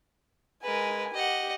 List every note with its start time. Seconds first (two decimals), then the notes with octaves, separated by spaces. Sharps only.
0.63 G#3 A#4 B4 G#5
1.14 G4 D#5 F#5